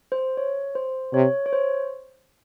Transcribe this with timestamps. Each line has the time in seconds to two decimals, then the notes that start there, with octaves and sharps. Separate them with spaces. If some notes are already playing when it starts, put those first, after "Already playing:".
0.12 C5
0.37 C#5
0.75 C5
1.14 C3 C#5
1.46 C#5
1.53 C5